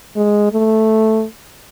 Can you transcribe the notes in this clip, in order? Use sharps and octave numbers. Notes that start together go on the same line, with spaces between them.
G#3
A3